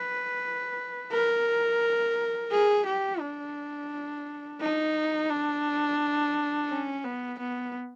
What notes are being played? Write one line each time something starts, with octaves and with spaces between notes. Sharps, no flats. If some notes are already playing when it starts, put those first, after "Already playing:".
Already playing: B4
A#4
G#4
G4
D4
D#4
D4
C#4
B3
B3